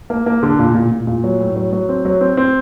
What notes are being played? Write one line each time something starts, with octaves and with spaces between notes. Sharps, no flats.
A#3
A#3
D3
A#2
A#2
A#2
A#2
F#3
A2
F#3
F#3
C4
F#3
C4
C4